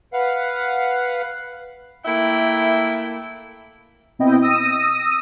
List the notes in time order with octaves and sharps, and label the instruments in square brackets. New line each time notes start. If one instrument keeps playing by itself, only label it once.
[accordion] B4 F5 F#5
[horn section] A3 A#3 E4 E5 G5
[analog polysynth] B2 C4 E4 D#5 G5
D#6 E6 A#6 D#7